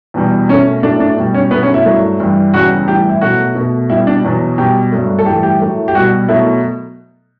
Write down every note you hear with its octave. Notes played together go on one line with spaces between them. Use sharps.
E2 B2 G3
B2 A3 C#4
A2 F#3 A3 D4
D4
B2 G3
C#4
B2 F#3 A3 B3
C#4
E4
G2 F#3 A3
G2 E3 G3
E2 C#3 G3 F#4
A2 E3 G3 G4
E4
B2 F#3 A3 F#4
B2 A3
B2 G3 E4
D4
E2 B2 F#3
B2 G3 G4
G2 F#3 A3
A4
A2 E3 G3 G4
G4
A2 F#3 A3
G4
B2 G3 F#4
B2 F#3 A3 E4